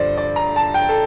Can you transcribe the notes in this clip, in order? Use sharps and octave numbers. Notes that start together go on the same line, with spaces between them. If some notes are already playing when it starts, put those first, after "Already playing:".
Already playing: G2 D3 F3 C5 D5
D5
A#5
A5
G5
A4